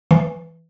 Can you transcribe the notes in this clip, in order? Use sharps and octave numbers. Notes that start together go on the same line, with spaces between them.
E3